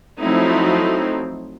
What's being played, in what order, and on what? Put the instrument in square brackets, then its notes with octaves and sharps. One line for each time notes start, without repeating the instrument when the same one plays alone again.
[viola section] F3 F#3 A3 C4 D#4 E4